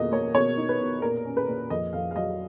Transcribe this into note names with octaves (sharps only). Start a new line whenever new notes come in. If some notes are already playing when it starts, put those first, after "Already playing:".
Already playing: F2 B2 A#3 D#5
A#3 C#5
B2 C#5
D#4
B4
B2
A#2 A#4
C#4
B4
A#2
F2 D#5
F2 F5
F5
F#3 D#5